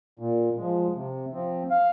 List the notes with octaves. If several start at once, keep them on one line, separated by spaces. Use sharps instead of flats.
A#2
F3 G#3
C3
F3 C4
F5